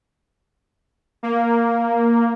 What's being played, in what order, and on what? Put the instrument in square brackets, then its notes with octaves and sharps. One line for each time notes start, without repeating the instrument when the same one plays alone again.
[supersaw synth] A#3